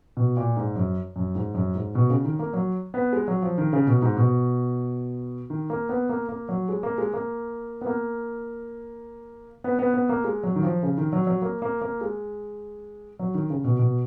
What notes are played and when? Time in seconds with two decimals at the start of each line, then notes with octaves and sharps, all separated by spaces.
0.17 B2
0.37 A#2
0.57 G#2
0.76 F#2
1.16 F#2
1.35 G#2
1.54 F#2
1.75 G#2
1.95 B2
2.10 C#3
2.25 D#3
2.39 A#3
2.53 F#3
2.94 B3
3.13 G#3
3.28 F#3
3.42 F3
3.58 D#3
3.73 C#3
3.87 B2
4.02 G#2
4.17 B2
5.50 D#3
5.70 A#3
5.89 B3
6.09 A#3
6.29 A#3
6.49 F#3
6.69 G#3
6.83 A#3
6.98 G#3
7.13 A#3
7.81 B3
7.86 A#3
9.64 B3
9.79 B3
9.94 B3
10.09 A#3
10.24 G#3
10.43 F#3
10.56 D#3
10.63 F3
10.83 C#3
10.98 D#3
11.13 F#3
11.27 F#3
11.42 A#3
11.62 A#3
11.81 A#3
12.01 G#3
13.19 F#3
13.35 D#3
13.50 C#3
13.64 B2
13.79 B2